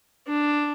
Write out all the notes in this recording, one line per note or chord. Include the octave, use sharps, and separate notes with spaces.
D4